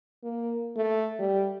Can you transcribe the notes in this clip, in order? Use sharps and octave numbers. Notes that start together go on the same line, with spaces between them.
A#3
A3
G3